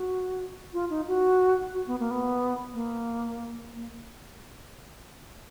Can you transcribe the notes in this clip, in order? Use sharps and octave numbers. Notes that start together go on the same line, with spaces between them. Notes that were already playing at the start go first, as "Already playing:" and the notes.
Already playing: F#4
F4
D#4
F#4
F#4
B3
A#3
B3
A#3
A#3